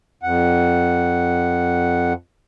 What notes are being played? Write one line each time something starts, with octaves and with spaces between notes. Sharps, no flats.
F2 F#5